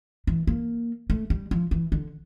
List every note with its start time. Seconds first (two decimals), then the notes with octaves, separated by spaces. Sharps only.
0.27 E3
0.47 A#3
1.10 A3
1.30 G3
1.51 F3
1.71 E3
1.92 D3